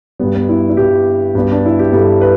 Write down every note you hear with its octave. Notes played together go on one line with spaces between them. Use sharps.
G2 G3 B3
B3
E4
E4
G2 G3 G4
G2 G3 B3
D4
E4
G4
G2 G3 A4
B4